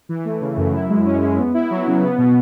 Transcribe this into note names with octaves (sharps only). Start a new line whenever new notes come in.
E3
A3
C#3
F#2
E4
G#3
C#4
G#3
B3
E4
F#3
C#3
B3
B2